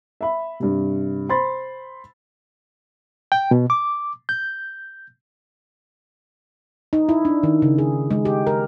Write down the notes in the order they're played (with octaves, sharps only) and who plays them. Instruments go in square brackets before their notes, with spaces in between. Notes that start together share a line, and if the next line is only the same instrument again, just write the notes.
[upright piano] E5 B5
G2 C3
C5 B5 C6 A6
[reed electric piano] G5
B2
D6
G6
[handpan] D#4
E4
D4
D#3
C#3
G#4
G#3
G4
A#4